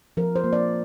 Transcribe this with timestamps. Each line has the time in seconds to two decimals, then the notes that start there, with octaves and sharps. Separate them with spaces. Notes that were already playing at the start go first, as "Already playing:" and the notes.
0.17 F3 A#4
0.36 C5
0.44 A#3
0.53 D5